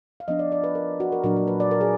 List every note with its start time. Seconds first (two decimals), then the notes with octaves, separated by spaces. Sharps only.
0.20 F5
0.28 F3 B3 D4 D#5
0.39 D5
0.52 D5
0.64 B4
0.75 A#4
1.00 F#4
1.12 A#4
1.24 A#2 F#3 D4 A#4
1.36 A#4
1.47 B4
1.60 D5
1.71 A#4
1.81 G#4